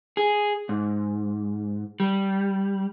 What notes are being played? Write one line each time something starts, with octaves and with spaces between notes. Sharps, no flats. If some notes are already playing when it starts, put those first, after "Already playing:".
G#4
G#2
G3